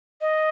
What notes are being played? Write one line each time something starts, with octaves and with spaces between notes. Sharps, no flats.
D#5